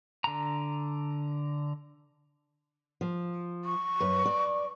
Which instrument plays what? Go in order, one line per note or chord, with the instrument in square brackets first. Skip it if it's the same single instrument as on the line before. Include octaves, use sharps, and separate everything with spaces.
[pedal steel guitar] D3 A#5
[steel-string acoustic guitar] F3
[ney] C#6
[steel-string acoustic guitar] F#2 B4
D5